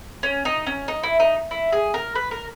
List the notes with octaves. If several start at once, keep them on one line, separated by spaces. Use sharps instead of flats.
C#4
D#4
C#4
D#4
E4
D#4
E4
G#4
A#4
B4
A#4